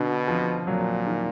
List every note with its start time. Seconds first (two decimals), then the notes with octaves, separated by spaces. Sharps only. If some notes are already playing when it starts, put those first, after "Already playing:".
Already playing: B2 D3
0.28 F3
0.67 A#2 F#3
1.07 D#3